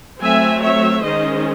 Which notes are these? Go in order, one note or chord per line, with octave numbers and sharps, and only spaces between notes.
F#3 A3 C4 E5 G#5
C#5 E5
D#3 G#3 C#4 C5 D#5